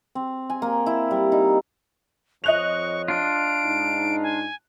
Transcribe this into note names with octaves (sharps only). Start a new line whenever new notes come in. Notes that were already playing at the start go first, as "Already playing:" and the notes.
C4
G#5
A#3
E4
G3
D#4
F2 F3 C#5 D#5 C#6 F#6 F7
D4 F4 D7
G#2 D#4
G#5